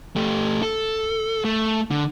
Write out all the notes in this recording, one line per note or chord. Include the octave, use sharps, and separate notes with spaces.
A3 G4
A4
A3
D3